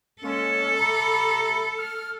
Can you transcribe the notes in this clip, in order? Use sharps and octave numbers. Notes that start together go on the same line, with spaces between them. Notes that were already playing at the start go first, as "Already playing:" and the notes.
G#3 A#3 C#4 A4
C3 A#5 B5
F6